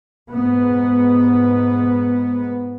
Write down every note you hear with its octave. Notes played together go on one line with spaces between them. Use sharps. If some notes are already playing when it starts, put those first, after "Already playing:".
G#2 B3